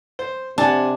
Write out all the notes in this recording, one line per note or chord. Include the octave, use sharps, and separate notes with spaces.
C5
C3 D4 F#5 G#5 A5